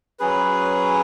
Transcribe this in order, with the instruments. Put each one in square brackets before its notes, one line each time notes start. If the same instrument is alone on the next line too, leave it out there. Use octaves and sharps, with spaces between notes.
[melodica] F#3 C#4 G#4 B4